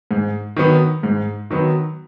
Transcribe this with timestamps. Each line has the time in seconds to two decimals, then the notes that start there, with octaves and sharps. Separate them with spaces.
0.11 G#2
0.57 D#3 F#3 B3
1.03 G#2
1.51 D#3 F#3 B3